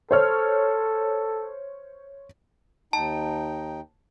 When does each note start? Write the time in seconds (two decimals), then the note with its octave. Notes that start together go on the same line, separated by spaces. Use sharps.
0.11 A4 C5 C#5 F6
2.93 D#2 D#4 G5 A5